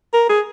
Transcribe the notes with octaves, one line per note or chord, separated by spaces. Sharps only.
A#4
G#4